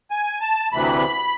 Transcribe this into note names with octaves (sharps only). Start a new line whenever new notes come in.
G#5
A5
D2 C3 E3 B5